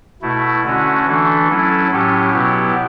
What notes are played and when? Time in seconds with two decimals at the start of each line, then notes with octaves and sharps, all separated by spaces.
0.22 B2 A3 E4
0.64 D3 A3 C#4 F#4
1.06 E3 A3 D4 A4
1.48 F#3 C#4 E4 A4
1.90 A2 F#3 C#4 G4
2.33 B2 F#3 B3 E4 G4